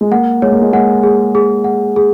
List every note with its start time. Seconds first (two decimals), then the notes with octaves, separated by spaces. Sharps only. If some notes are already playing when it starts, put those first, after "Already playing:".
0.01 G#3
0.11 A#3 F#5
0.42 G#3 C#5
0.52 A#3
0.62 G#3
0.73 G#3 F#5
1.03 G#4
1.35 G#4
1.64 F#5
1.96 G#4